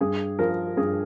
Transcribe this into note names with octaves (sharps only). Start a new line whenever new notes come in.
G2 G#4
F3 A#4
G2 G#4